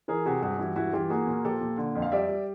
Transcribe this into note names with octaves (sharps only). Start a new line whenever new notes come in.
E3 G#4 A#4
C3 F#4 G#4
G2 F#4 G#4
E3 E4 F#4
G2 E4 F#4
E3 F4 G4
A#3 F#4 G#4
A#2
F3 G4 A4
A#2
D3
F2
F5
G3 D5 E5
G3